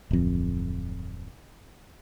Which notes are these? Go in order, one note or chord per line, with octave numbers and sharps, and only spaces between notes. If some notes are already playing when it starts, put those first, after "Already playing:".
D1 F2